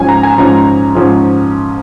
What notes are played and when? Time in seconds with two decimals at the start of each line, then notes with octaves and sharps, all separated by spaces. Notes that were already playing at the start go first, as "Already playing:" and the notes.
Already playing: G#2 F3 C#4 G#5
0.09 A#5
0.23 G#5
0.38 G#2 F3 C#4 A#5
0.95 G#2 F3 C#4